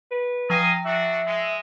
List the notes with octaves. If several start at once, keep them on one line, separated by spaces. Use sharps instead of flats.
B4
F3 D#5 F5 G5 G#5 A#6
D4 F#4 E5
G#3